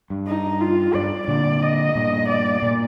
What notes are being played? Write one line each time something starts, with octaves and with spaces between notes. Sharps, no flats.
G2
D#4
F4
G2 D5
A#2 D3 D5
D#5
G2 A#2
D5
A#2